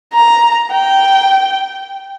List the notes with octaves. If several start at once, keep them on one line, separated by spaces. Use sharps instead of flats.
A#5
G5